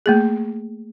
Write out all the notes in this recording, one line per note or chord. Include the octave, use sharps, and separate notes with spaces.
A3 A#3 G#4